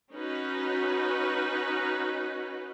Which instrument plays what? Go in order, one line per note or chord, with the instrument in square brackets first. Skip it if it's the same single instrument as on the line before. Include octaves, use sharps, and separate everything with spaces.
[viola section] C#4 D#4 F#4 B4